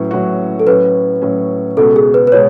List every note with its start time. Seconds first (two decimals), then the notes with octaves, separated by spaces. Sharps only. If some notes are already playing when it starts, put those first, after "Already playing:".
Already playing: A2 F#3 C#4 F#4 B4
0.11 A2 F#3 C#4 F#4
0.60 A4
0.67 A2 F#3 C#4 B4
1.22 A2 F#3 C#4
1.77 C#2 B2 G#3 B3 F#4 A4
1.96 G#4
2.14 B4
2.27 B4
2.32 B2 G#3 B3 C#5